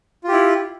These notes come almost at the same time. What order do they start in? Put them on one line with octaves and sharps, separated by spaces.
F4 G4 E4